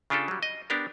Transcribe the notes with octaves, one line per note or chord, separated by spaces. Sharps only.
C#3 D4 F4 G4 A4
F#3 G3
D#5
B3 D4 G4 A#4